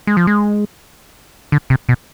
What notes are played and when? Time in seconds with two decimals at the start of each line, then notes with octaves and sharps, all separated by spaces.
0.07 G#3
0.17 F3
0.27 G#3
1.52 D3
1.70 C3
1.89 B2